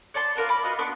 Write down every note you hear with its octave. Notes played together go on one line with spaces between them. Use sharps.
C#5 D5 A5 C6
F4 A#4 B4 A5
B5 D6
F4 F#4 D#5
B3 D4 C6 C#6